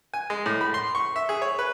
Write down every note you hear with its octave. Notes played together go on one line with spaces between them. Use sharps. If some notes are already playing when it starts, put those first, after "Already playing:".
G#5
G#3
A2
B5
C6
C#6
E5
G#4
C#5
B4